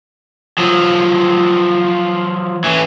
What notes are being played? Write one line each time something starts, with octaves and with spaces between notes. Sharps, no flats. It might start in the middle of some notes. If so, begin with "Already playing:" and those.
F3 F#3
E3 C#4